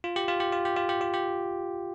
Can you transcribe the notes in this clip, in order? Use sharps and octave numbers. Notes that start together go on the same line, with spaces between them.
F4
G4
F4
G4
F4
G4
F4
G4
F4
G4